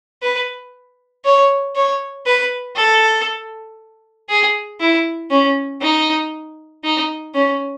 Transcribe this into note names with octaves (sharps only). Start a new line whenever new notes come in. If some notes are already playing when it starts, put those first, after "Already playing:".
B4
C#5
C#5
B4
A4
G#4
E4
C#4
D#4
D#4
C#4